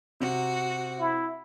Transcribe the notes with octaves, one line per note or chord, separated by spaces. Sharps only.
C3 F#4
E4